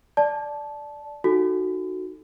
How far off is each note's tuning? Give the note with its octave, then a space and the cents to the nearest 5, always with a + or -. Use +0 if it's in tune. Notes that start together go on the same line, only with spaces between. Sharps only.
D5 +0 A5 -15
D#4 -10 F#4 -5 A4 +0